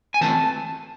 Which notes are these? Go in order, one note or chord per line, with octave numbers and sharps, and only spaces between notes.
G#5
E3 A3 C4 A5